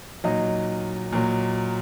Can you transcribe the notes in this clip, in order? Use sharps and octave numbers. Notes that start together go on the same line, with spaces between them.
A#2 F#3 D#4
A#2 F#3